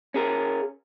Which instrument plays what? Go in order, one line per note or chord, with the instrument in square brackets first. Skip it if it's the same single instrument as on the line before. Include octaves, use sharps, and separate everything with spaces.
[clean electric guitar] C#4 G#4 A#4